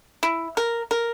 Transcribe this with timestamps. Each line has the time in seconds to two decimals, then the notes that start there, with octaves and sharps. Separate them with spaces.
0.23 E4
0.57 A#4
0.91 A#4